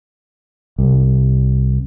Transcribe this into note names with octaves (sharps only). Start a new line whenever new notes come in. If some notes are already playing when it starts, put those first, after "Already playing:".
C2